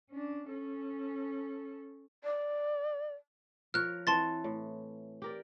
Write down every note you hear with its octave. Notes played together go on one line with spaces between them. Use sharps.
C#4 D4
C#4 A4
D5
F3 A#4 C#5 F6 F#6
E3 C4 C#5 A5 C6 A6
A2
G4 A#4 D5